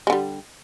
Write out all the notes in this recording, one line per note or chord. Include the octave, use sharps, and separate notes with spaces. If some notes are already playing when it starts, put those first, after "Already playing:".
D3 G3 G#3